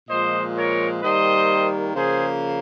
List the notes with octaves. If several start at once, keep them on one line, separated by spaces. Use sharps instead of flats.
A#2 F3 G#3 C5 D#5
A#4 C#5
D#3 G3 A#3 C5 D#5
C#3 F3 A#3 G#4 C5